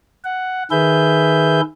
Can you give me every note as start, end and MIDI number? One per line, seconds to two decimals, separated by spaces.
0.24 0.63 78
0.71 1.61 51
0.71 1.61 68
0.71 1.61 71
0.71 1.61 76
0.71 1.61 91